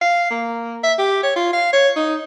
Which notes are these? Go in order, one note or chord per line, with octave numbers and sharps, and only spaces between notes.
F5
A#3
E5
G4
C#5
F4
F5
C#5
D#4